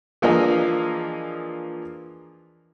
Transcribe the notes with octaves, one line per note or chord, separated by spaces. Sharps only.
E3 F3 A#3 D4 G#4 D#5